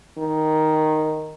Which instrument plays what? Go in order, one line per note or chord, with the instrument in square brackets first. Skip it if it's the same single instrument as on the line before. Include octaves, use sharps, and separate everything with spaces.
[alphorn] D#3